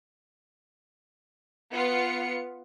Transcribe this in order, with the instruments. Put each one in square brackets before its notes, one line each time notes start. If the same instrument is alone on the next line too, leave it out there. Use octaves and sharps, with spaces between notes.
[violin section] B3 F4 C#7